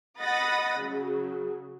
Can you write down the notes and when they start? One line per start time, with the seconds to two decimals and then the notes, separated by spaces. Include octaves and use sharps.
0.20 D#5 F#5 B5 D#6 A6 A#6
0.79 C#3 F#3